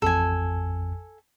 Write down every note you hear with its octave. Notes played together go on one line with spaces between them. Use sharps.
A1 F2 A4 G#5